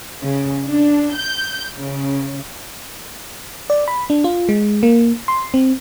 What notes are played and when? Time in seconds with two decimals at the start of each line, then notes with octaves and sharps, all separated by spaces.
0.22 C#3
0.67 D4
1.15 G6
1.75 C#3
3.70 D5
3.88 B5
4.10 D4
4.24 F4
4.49 G#3
4.83 A#3
5.28 C6
5.54 C4